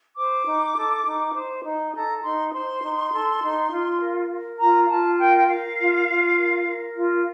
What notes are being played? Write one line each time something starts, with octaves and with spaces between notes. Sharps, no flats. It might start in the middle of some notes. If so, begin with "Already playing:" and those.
C5 D6
D#4
A4
D#4
C5
D#4
A4 A#5
D#4 C6
C5 C6
D#4
A4
D#4
F4
A#4
A#4
F4 A#5
F4 A5
A#4 G5
G5
A#4 F5
F4
F4
A#4
A#4
F4